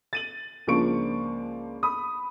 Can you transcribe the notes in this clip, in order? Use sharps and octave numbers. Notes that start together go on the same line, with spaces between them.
A6 D#7 F#7
C#2 F3 A#3 D4 C#6 D7
B5 D#6